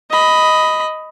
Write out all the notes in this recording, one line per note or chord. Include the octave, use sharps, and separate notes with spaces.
D#5 B5